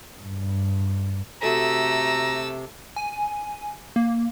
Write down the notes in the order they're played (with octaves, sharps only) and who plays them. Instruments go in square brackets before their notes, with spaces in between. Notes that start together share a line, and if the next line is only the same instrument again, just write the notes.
[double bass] G2
[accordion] C3 [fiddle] A3 E6 [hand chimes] F#4 A4 B6 [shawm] A#5
[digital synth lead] G#5
A#3